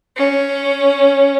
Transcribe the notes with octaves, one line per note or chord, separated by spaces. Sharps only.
C#4